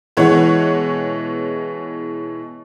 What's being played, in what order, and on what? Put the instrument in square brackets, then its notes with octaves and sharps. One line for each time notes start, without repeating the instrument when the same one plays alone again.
[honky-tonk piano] B2 E3 G#3 C#5 F#5